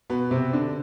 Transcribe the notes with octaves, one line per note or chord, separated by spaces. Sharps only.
B2 B3
C3 C4
D3 D4